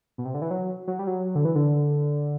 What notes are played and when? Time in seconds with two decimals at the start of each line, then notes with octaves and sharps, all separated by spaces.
0.18 B2
0.25 C3
0.34 D3
0.42 E3
0.51 F#3
0.87 F#3
0.99 G3
1.07 F#3
1.35 D3
1.45 E3
1.55 D3